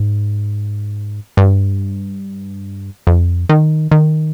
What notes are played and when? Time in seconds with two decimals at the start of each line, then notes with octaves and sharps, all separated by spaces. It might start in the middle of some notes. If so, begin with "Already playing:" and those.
Already playing: G#2
1.37 G2
3.07 F2
3.49 D#3
3.91 D#3